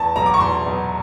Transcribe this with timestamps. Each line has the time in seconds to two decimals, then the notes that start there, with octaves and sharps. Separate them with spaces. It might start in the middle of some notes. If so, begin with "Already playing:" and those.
Already playing: E2 A5
0.15 B2 F#3 A#5
0.26 D6
0.34 C#6
0.40 E2 C6
0.66 B2 F#3